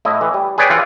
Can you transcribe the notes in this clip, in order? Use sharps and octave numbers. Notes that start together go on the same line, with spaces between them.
A2 E4 D#5
E3
G3
G#4 B4 C#5 D5 G5
E3 F4 F#5